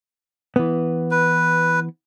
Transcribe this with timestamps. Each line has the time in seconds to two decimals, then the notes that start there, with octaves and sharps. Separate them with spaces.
0.56 E3 B3
1.11 B4